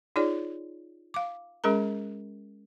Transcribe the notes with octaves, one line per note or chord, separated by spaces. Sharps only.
D#4 F4 G#4 C#5 D5
F5 D6
G#3 C#4 G#4 A#4 A#5